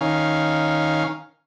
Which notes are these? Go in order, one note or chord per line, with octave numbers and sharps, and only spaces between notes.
D#3 C#4 F5